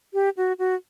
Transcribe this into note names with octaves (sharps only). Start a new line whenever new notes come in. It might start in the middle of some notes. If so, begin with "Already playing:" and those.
G4
F#4
F#4